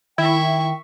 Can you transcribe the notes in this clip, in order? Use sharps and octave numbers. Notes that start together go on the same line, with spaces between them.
D#3 E4 E5 G5 C#6